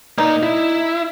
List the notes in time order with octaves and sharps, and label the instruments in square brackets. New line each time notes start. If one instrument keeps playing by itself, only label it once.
[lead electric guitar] A#3 D5 [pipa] D#4
[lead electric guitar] E4